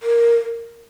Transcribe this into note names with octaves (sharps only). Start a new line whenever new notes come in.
A#4